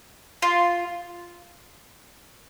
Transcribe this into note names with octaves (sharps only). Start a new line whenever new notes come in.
F4